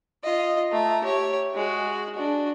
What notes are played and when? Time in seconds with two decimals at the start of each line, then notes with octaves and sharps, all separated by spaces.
0.24 F4 D#5
0.72 A3 A#5
1.04 G4 C#5
1.55 G#3 F#4
2.15 D4 F#4